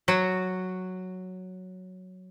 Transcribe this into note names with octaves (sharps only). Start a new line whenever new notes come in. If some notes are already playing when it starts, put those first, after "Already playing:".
F#3 F#4